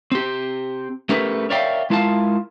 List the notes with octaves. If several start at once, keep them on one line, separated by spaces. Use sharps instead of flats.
C4 G4
A3 C#4 G4 A#4 B4
A#4 C#5 D5 E5 F5 G5
G#3 E4 F4 A#4 F5 A5